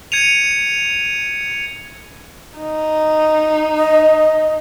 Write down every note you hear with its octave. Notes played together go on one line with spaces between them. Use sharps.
G#6 C#7 D#7 F7
D#4
D#5